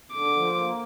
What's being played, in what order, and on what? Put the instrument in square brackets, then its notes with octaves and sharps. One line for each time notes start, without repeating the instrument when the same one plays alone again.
[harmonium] D3 [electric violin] D6
[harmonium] F3
A#3